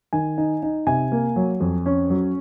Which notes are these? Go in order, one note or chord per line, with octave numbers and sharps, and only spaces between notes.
D#3 G#5
D#4
D#4
C3 G#5
A#3
F#3
F2
C#4
F#3